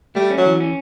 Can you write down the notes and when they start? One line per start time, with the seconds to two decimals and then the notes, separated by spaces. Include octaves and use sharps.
0.15 G3 A3
0.30 C#4
0.38 F#3
0.45 E3
0.60 C#4